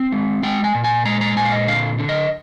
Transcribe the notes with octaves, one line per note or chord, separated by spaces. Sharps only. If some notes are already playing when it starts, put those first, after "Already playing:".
Already playing: C4
G#3
G#3 G5
G#5
A#2
G#5
G#3 A#5
A#5
A#2 G#5
F5
D#5
D3 F5
D3
D#5